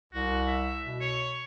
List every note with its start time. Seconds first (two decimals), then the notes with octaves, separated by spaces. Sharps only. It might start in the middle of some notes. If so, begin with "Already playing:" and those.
0.13 C2 F#4
0.47 E5
0.85 B2
1.01 C#5